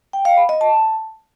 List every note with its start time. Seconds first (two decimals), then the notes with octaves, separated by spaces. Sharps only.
0.13 G5
0.25 F5
0.37 B5
0.49 D#5
0.61 A5